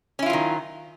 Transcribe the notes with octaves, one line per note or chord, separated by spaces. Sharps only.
D#3 F#3 C#4 E4 F4